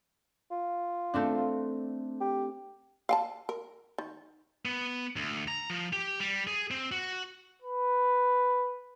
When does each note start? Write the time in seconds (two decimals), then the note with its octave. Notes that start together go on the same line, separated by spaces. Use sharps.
0.51 F4
1.14 A3 C4 D4
2.21 G4
3.09 F5 G5 A5
3.49 A#4
3.98 D#3
4.65 B3
5.16 D2
5.48 A#5
5.70 F3
5.93 G4
6.20 G3
6.47 G#4
6.71 C4
6.92 F#4
7.62 B4